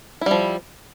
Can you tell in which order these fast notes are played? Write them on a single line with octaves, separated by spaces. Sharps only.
E4 G3 F3